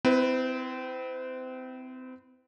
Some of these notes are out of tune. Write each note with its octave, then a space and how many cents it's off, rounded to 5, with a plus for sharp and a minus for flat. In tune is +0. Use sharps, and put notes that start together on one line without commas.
C4 -30 E4 +0 B4 +5